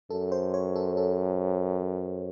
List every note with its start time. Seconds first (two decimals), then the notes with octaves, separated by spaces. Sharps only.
0.10 F#2 A4
0.32 C5
0.54 C#5
0.76 A4
0.97 A4